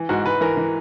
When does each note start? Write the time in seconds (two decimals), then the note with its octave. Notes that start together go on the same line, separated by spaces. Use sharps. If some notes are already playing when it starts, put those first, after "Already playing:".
Already playing: E3
0.09 G#2 F#4
0.25 G#2 B4
0.41 E3 A#4
0.57 E3